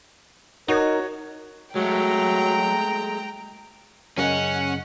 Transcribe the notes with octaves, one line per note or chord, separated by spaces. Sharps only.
D#4 F#4 A#4 C#5
F#3 G#3 A3 G5 A#5
F#2 C#3 C#4 A#4 D#5 F#5 G#5